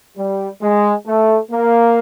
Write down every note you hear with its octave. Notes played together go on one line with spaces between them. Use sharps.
G3
G#3
A3
A#3